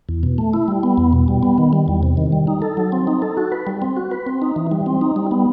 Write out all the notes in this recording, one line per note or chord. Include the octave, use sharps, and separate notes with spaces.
E2
B2
A3
E4
G3
B3
E2
B2
G3
B3
D#3
G3
E2
C3
D#3
G3
D#4
A4
F#3
C4
D#4
A4
F#4
B4
G3
C4
F#4
B4
C4
D#4
E3
G3
C4
D#4
G3
B3